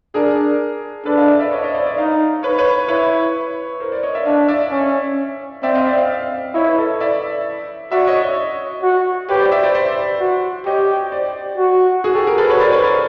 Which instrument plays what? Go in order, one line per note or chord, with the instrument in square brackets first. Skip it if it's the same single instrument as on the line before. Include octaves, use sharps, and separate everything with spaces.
[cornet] D4 [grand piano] G#4 A#4
[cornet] D4 [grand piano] A4 B4
[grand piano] D#5 F5
D5 E5
D5 E5
C#5 D#5
C#5 D#5
C5 D5
D5 E5
[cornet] D#4 [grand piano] D#5 F5
[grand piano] B4 C#5
B4 C#5
[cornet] E4 [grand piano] B4 C#5
[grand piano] A#4 C5
C5 D5
C#5 D#5
D5 E5
[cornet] D4 [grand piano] D#5 F5
[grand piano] D5 E5
[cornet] C#4
[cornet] C4 [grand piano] D5 E5
[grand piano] D#5 F5
D5 E5
D#5 F5
[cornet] E4 [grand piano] C#5 D#5
[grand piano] B4 C#5
A4 B4
D5 E5
[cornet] F#4 [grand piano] D5 E5
[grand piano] C#5 D#5
C#5 D#5
[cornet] F#4
[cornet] G4 [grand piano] B4 C#5
[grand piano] C5 D5
D5 E5
C5 D5
C5 D5
[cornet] F#4
[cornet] G4 [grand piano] C#5 D#5
[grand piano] C5 D5
[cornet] F#4
[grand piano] F#4 G#4
G4 A4
G#4 A#4
A4 B4
[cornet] F#4 [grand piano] B4 C#5
[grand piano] C5 D5
B4 C#5
A#4 C5